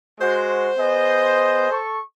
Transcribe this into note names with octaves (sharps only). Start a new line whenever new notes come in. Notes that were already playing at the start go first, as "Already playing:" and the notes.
G#3 F#4 C5
B3 G#4 D#5
A4 C#6